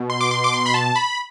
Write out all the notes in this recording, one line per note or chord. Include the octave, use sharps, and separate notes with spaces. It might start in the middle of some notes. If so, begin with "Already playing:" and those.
Already playing: B2
C6
D6
C6
D6
C6
B5
A5
B5